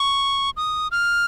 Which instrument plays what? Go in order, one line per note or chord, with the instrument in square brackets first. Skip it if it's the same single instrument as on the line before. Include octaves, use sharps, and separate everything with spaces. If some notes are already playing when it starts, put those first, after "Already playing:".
Already playing: [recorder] C#6
D#6
F6